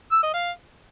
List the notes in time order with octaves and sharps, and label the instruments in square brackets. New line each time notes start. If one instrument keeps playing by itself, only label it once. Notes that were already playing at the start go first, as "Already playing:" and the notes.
[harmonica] E6
D#5
F5